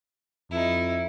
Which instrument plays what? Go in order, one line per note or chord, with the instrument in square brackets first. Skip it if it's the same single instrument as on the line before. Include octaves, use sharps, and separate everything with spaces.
[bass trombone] F2 [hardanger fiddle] D#4 E4